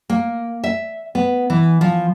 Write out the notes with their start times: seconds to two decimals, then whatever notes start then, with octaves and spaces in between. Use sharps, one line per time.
0.10 A#3
0.64 E5
1.15 B3
1.50 E3
1.81 F3